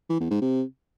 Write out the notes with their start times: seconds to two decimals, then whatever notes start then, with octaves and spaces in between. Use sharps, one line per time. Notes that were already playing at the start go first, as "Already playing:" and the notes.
0.09 E3
0.20 E2
0.31 G#2
0.41 C3